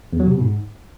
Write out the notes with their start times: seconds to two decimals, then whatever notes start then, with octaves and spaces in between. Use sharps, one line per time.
0.13 E2
0.20 F#3
0.27 C3
0.34 B2
0.41 G#2